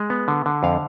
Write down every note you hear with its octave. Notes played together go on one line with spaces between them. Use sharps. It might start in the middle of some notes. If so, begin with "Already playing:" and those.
Already playing: G#3
B3
D3
D3
F2 F5